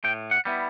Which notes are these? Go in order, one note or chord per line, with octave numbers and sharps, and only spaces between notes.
A2 G5
F#5
G3 B3 E4